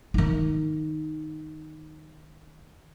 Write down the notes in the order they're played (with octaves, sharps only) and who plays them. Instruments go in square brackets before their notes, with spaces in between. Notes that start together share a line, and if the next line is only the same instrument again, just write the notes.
[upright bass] D#3 D#4